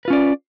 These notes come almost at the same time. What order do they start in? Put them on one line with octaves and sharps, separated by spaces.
B4 F4 C#4 D5